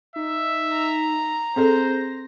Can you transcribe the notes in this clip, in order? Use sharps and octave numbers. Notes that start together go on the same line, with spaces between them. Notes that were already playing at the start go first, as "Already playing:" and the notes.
D#4 E5
A#5
C4 G#4 A4 C5 A#6